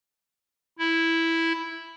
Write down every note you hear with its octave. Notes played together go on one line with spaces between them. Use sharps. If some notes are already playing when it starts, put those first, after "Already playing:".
E4